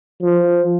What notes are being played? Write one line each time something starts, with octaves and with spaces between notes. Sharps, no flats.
F3